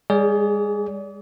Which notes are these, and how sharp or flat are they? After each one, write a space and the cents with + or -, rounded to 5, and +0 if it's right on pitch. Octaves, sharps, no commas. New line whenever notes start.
G#3 -45 G#4 +0 D5 -40